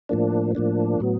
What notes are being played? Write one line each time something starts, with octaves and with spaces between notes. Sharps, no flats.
A2 F3 A#3 D4
A2 F3 A#3 D4
A2 F#3 B3